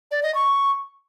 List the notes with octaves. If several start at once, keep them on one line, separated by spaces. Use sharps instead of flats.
D5
D#5
C#6